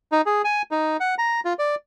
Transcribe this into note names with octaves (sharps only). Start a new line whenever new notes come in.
D#4
G#4
G#5
D#4
F#5
A#5
F4
D5